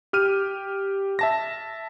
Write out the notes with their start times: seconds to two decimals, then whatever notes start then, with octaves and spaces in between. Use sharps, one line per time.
0.13 G4 F6 D#7
1.19 E5 A5 A#6